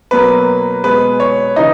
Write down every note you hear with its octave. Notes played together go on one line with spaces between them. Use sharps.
B2 F#3 A#3 B4
B2 G#3 B4
C#5
C#3 E3 D#4 D#5